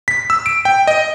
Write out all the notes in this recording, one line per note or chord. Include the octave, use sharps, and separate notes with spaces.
B6
E6
D7
G5
D#5